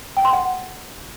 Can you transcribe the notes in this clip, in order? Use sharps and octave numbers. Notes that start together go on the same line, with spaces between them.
G5
C6
F#5